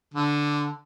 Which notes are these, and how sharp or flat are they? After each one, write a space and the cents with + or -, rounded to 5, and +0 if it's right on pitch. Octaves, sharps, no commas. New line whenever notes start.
D3 -5